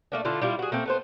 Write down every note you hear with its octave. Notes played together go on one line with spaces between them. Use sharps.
A3 A#3 D4
D3 E4 F4 A4
G3 E4 F4
F#4 G#4
A3 A#3 C4
A3 B3 C5